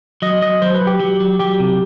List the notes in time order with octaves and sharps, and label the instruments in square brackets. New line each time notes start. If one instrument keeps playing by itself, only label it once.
[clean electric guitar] F#3 [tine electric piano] D#5
[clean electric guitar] F#3 [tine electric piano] D#5
[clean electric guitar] F#3 [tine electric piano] C5
[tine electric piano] B4
[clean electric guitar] F#3
[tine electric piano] G4
[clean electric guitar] F#3
F#3
[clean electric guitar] F#3 [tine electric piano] G4
[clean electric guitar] C3